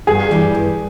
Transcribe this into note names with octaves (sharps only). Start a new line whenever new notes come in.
G2 G#4
E3 G3
G2